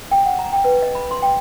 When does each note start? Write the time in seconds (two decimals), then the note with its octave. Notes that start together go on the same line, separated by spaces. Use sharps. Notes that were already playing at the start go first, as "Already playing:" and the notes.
0.11 G5
0.26 F#5
0.39 A#5
0.53 G5
0.64 B4
0.82 D#5
0.95 B5
1.11 C6
1.22 G5